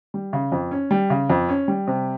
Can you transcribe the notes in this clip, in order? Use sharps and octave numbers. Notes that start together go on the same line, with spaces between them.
G3
C#3
F2
C#4
G3
C#3
F2
C#4
G3
C3